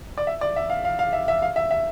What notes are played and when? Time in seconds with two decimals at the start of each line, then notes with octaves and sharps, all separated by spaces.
0.18 D5
0.27 E5
0.41 D5
0.56 E5
0.70 F5
0.85 F5
0.99 F5
1.13 E5
1.28 E5
1.42 F5
1.56 E5
1.71 E5